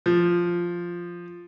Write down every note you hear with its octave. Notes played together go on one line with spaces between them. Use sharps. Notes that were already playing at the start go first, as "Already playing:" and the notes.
F3